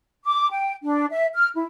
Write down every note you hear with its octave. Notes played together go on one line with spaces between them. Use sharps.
D6
G5
D4
E5
F6
E4